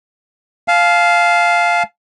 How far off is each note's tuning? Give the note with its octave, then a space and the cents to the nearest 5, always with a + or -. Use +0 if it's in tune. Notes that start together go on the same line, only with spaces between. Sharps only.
F5 +0 A5 -40